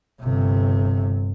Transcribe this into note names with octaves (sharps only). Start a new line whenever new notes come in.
G1 C3